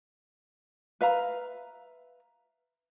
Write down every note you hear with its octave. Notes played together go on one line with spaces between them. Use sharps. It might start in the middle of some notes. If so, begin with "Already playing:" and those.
B4 E5 F5 A#5